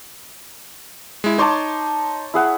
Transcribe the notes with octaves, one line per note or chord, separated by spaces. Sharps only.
G#3 E4
D#4 C#5 A5 C6 D6
E4 G#4 F#5